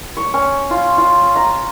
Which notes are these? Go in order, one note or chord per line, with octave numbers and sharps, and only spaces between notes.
C#5
C#4
F4
F4
A#5